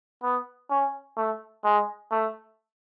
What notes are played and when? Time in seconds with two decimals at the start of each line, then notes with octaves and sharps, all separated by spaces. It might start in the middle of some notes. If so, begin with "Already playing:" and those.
0.23 B3
0.70 C#4
1.17 A3
1.64 G#3
2.11 A3